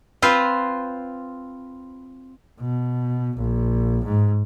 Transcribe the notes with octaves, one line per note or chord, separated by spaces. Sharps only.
C4 F4 B4 C5
B2
A#1
G#2